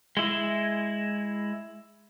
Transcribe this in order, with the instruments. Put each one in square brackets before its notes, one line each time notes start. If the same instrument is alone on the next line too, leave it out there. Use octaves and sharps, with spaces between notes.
[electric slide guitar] G#3 E4